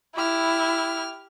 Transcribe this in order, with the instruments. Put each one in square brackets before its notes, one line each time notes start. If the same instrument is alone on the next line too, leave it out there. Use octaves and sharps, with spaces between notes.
[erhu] E4 [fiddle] G4 F6